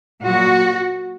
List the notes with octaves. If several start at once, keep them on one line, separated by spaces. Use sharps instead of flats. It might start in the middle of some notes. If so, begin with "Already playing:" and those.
A#2 F#3 F#4